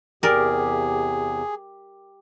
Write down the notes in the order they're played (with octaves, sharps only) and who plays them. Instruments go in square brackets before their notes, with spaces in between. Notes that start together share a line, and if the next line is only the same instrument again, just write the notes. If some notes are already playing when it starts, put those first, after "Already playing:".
[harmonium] E2 C3 [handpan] G4 [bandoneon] G#4 [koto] A#4 D5